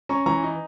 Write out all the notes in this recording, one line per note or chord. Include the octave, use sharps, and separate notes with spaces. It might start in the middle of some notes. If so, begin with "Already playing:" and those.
C#4 A#5 C#6
E3 A#5 C#6
D#4